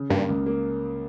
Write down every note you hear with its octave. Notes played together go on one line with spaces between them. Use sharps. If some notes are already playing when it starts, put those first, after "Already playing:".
Already playing: C#3
G2 A#3
C#2
A#3